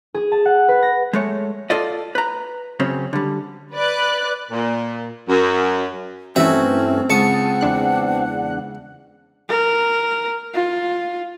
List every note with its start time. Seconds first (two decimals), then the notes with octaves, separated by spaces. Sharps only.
0.14 G#4
0.32 A5
0.45 F#5
0.68 B4
0.82 A#6
1.13 G#3 A3 C#5
1.70 F4 A4 D5 D#5
2.15 B4 A#5
2.80 F#2 C#3 C4 C#4
3.13 D3 G3
3.75 B4 D5 F#6
4.51 A#2
5.28 F#2
6.36 G2 E3 A3 C4 C#4 F#4 E5
7.10 C#2 F#5 A5 C#6 D#6
7.61 E2 D4 F#6
9.49 A#4
10.54 F4